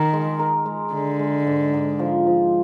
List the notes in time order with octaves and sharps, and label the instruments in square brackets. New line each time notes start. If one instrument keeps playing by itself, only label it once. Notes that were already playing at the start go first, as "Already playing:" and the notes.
Already playing: [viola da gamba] D#3 [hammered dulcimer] A#4
[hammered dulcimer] G#3
A#4
G#3
[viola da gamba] D3 [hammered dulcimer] G#3
[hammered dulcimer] G#3
G#2
G#2
F3
F3